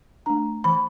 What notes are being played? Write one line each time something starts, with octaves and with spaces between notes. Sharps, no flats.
A3 D4 A#5
E3 B5